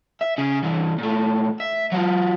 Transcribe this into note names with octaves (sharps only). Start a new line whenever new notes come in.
E5
C#3 G#4
G2 E3
A#2 A3
E5
F#3 F4